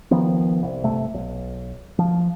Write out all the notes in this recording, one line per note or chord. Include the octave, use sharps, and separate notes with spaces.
D#3 F3 B3
C2
G1 C3 A3
B1
F3